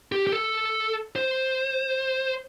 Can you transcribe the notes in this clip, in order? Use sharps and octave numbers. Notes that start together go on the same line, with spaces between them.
G4
G4
A4
C5